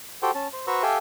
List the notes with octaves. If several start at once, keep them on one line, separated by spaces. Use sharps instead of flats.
F#4 G4 A4 C5 G5
C#4 A5
C5
F#4 B4 C5 A#5 C#6 E6
G4 A4 E5 F5 G5 G#5